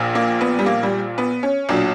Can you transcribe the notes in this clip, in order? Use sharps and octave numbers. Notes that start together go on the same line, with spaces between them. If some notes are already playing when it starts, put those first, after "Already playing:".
Already playing: A#1 A#2
A#3
B3
G3
A#3
G3
B3
C#4
B1 A#2 F#3 D4